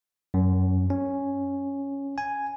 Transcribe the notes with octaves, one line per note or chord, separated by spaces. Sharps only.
F#2
C#4
G#5